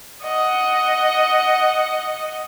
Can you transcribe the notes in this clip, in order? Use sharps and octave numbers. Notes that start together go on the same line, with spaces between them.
D#5 F#5